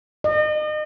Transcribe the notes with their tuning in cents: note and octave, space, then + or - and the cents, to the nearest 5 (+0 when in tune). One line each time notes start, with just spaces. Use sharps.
D#5 -35